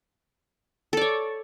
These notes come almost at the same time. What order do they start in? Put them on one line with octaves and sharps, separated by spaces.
A4 D5 C#5